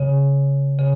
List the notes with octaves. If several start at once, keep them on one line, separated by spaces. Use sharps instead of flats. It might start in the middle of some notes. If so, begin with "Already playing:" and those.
Already playing: C#3
C#3